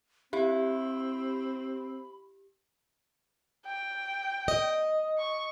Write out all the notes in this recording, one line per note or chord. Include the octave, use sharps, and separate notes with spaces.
C4 E4 G4 B5
G5
D#5
C#6